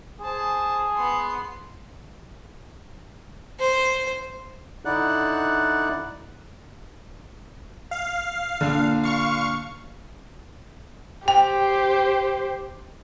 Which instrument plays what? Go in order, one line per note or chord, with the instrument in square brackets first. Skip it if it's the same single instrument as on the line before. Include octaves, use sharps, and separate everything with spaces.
[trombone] G#4 [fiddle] C5 A5
[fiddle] B3 C6
C5
[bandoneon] D3 D#4 E4 D5 F#5 F#6
[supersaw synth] F5
[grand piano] A#2 D3
[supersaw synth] F5 C#6
[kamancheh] G4 C5 [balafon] G5